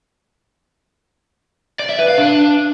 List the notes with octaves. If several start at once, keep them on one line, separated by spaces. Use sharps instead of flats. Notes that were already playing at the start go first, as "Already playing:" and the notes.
D5
E5
B4
F5
D4